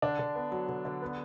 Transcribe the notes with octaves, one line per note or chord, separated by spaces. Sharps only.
D3 D4
D3
B3
F#3
D3
D3
B3